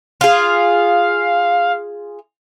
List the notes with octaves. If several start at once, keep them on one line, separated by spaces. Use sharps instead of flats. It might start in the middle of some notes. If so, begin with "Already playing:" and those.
F4 G#4 F5